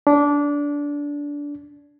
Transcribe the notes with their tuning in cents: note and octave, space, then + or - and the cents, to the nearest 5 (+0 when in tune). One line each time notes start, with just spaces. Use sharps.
D4 -20